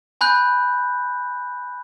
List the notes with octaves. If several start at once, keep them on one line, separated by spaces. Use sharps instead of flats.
G#5 B5 F#6 G6